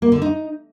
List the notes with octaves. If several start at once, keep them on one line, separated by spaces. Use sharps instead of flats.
A#3
D3
D#4